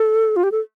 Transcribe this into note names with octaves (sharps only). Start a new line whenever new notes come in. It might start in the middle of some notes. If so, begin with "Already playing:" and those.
Already playing: A4
F4
G4
A4